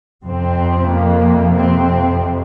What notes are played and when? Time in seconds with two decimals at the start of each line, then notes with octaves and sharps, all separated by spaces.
0.24 F2 C3 C4
0.88 A#3
1.53 C4